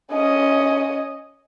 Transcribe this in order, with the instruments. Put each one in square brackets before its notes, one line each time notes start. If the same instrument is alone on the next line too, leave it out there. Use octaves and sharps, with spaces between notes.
[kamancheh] C#4 D#5